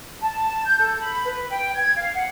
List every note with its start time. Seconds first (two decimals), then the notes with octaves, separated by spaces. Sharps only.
0.21 A5
0.65 G6
0.79 A4
1.00 B5
1.25 B4
1.50 G5
1.75 G#6
1.96 F5
2.15 F#5